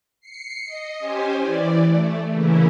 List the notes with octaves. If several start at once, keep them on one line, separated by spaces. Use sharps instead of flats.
C7 C#7
D#5
C#4 G4 C5 G#5
E3 D5
A3
C#3 E3 A#3 C#4 E4